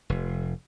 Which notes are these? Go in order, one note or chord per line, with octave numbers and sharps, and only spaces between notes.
F1